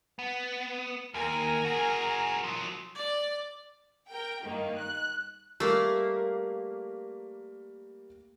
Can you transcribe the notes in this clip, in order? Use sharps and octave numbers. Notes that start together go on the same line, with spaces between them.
B3
D#2 A#4 G#5 A#5
F#4 G#4
F3 F#3
D5
A#4 G5
G2 D#3 A#3
F#6
G3 A3 A#3 A#4